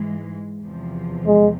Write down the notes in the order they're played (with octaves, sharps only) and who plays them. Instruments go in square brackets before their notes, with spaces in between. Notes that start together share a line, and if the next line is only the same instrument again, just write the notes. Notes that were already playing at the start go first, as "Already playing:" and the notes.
Already playing: [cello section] G#2 E3 G#3
E2 C3 F3
[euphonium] G#3